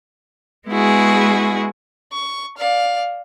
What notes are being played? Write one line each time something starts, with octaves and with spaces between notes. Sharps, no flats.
G#3 B3 E4 F#4 G#4
C#6
D5 F5